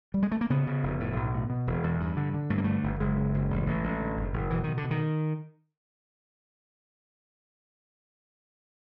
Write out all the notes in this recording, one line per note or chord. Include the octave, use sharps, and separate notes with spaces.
G3
G#3
A3
A#3
C#3 B3
C#3
F1
A2
B1
A2
B2
E1
E2
G2
D3
D3
G2 A3
A#3
D3 A3
G1
F#1 G#3
C#3
F#1
A1
A1
A1
D3
F#1
F#1
B2 E3
B2 D#3
D3
B2
D#3